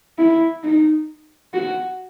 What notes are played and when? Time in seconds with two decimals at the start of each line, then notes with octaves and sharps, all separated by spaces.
0.18 E4
0.63 D#4
1.54 F#4